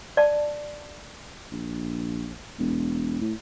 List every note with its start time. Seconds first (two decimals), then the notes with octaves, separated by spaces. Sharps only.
0.17 D5 A5
1.52 A#1
2.59 E1
3.21 A2